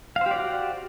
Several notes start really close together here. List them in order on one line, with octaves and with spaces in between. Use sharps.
F5 C5 G4 D5 F#4